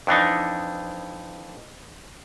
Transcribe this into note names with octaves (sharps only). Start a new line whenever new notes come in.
F2 E3 D4 D#4